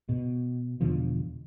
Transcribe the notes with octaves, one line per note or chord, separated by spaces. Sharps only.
B2
E1 B2 D3 F3